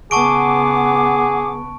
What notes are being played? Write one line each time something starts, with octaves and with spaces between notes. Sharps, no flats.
C#3 B3 G#4 F#5 A5 C#6 D6 D7